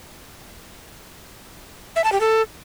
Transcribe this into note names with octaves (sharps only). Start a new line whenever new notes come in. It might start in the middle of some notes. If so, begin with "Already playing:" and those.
E5
A5
G4
A4